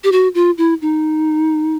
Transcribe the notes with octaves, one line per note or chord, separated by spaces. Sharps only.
G4
F#4
F4
E4
D#4